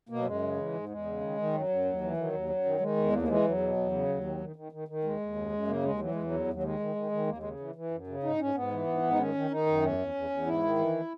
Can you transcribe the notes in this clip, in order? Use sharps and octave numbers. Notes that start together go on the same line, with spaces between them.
B2 A#3
F#3
F#2 G#3
C#3
E3
G#2
E2 G#3
C#3
D#3
D#3
F#2 F#3
F#2
D#2
E3
D#3 F#3
D#2
F#2
D#3
D#3 G#3
E2
D#2 A#3
A#3
E3 G#3
E2 F#3
B2
E2
C#3
D#2
D#3
D#3
D#3
D#3
D#3
D#2 G#3
D#2
F#2
F#2
C#3 A#3
D#2 G#3
E3 F#3
E2 G#3
F#3
D#2
D#2
F#3
D#3 G#3
D#3
D#3
D#3
D#2 A#3
G#3
C#3
E3
E3
F#2
C#3
G#2 D#4
G#2 C#4
G#2 B3
E3
G#2
G#2
D#4
D#3 C#4
D#3
D#3 D#4
F#2
E2 C#4
E2
E2
E2
G#2 E4
D#3
E3